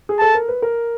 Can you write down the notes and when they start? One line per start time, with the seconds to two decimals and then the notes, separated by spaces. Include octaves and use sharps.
0.09 G#4
0.19 A4 A5
0.35 A#4
0.48 B4
0.62 A#4